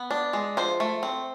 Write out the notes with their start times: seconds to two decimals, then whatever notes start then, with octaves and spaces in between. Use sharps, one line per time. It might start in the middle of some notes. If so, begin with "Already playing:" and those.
Already playing: B3
0.11 D4
0.33 G#3
0.57 F3 C5
0.80 A3
1.03 C4